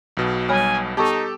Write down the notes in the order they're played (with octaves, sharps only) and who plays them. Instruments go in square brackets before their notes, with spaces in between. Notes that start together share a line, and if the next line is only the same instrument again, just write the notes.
[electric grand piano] B1 B2
[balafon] G3 C#5 B5 [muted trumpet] G#5
[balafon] B3 A5 C#6 [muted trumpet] D#4 [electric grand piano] G4 A4